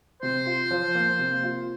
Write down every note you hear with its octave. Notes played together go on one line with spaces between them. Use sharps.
C3 C5
F4
F3
A#3
C3
F4